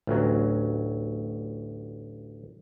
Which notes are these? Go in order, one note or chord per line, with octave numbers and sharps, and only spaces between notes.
A1 D2 F#3